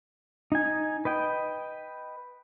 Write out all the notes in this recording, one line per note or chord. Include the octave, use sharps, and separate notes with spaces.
D#4 G#5
B4 D#5 G5